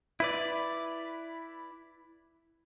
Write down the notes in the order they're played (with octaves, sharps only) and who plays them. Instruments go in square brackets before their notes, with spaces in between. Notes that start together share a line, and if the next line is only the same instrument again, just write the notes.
[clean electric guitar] E4 B4 D5